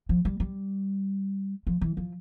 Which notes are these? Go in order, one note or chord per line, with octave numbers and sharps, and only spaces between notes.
F3
G3
G3
F3
E3
F3